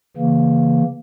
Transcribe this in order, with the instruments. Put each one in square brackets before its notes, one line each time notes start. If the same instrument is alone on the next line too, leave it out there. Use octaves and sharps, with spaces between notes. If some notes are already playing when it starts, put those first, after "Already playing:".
[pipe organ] C#3 E3 A#3